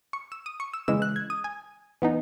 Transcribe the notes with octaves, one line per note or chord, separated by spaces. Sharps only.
C#6
E6
D#6
C#6
E6
C#3 E3 G#3 E6
F#6
G#6
D#6
G#5
E3 B3 D#4